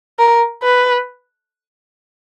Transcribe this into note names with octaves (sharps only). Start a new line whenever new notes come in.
A#4
B4